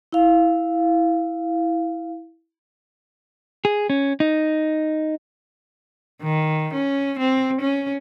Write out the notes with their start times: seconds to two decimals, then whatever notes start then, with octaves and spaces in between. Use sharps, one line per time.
0.12 E4 F5
3.65 G#4
3.90 C#4
4.20 D#4
6.22 D#3
6.74 C#4
7.19 C4
7.61 C#4